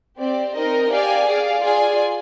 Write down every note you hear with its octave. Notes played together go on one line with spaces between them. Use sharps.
C4 G4 D5
C4 D#4 A#4 D#5
G4 D5 F5 G#5
G#4 D5 F5
F4 G#4 D5 G#5